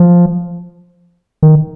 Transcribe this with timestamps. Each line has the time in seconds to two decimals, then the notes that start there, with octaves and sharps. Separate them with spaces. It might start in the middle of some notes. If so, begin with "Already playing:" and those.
Already playing: F3
1.43 D#3